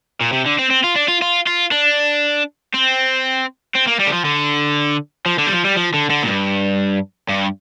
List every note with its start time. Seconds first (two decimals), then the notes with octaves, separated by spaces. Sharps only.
0.21 A#2
0.32 C3
0.46 D3
0.58 C4
0.70 C4
0.84 F4
0.96 D4
1.08 F4
1.22 F4
1.47 F4
1.71 D4
2.74 C4
3.75 C4
3.87 A#3
4.00 G3
4.07 D3
4.12 F3
4.25 D3
5.26 F3
5.39 D3
5.47 G3
5.52 F3
5.65 G3
5.77 F3
5.94 D3
6.10 D3
6.23 A#2
6.27 G2
7.28 G2